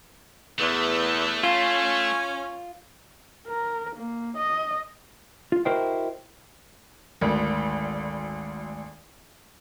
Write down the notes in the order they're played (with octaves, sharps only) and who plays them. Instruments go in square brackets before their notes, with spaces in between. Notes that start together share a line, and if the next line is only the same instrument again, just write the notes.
[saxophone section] E2 [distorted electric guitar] A3
[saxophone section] C#4 [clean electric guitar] F4
[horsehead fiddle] A#4
A#3
D#5
[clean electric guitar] F4
E4 F#4 A#4 C5 D#5 G5
[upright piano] G#1 D2